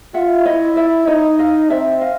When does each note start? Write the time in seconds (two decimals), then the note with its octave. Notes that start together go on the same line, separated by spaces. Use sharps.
0.14 F4 E5 F#5
0.45 E4 C#5 D#5
0.76 D5 E5
1.07 D#4 C#5 D#5
1.39 D#5 F5
1.69 C4 D5 E5
2.01 D#5 F5